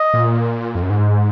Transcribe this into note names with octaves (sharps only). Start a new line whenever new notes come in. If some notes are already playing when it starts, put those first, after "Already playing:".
Already playing: D#5
A#2
F2
F#2
G#2